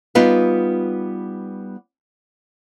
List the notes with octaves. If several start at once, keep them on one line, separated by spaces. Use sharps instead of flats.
G3 B3 D#4 F4 B4